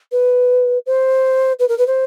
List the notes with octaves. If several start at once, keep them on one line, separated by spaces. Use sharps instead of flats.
B4
C5
B4
A#4
B4
C5